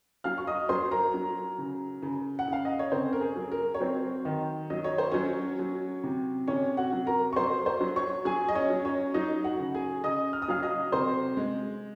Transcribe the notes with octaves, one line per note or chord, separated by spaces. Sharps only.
F#3 F5 F6
C#6
D#5 D#6
F#3 C5 C6
A#4 A#5
F#3
C#3
C#3
F#5
C#3 F5
D#5
C#5
C#3 C4 C5
A#4
G#4
F#3
A#4
C#5
F#3 C4 C5
D#3
F#3 D#5
C#5
C5
F#3 C#4 C#5
F#3
C3
C3 C#4 C#5
F#4 F#5
F#3
A#4 A#5
C#6
F#3 C5 C6
C5 C6
F#3
C#5 C#6
F#3 G#4 G#5
D#5
C#4 C#5
F#3
C#4 C#5
F#3 D#4 D#5
F#4 F#5
C#3
G#4 G#5
C#3 D#5 D#6
F6
D#6
F#3 F5 F6
D#5 D#6
C3 C5 C6
G#3